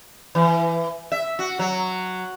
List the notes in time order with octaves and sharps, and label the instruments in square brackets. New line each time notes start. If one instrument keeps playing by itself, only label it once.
[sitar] E3
E5
F#4
F#3